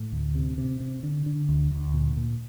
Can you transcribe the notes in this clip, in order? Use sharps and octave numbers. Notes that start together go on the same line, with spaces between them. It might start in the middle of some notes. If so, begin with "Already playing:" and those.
Already playing: A2
D2
C3
C3
C3
D3
D3
D2
D2
A#2
A#2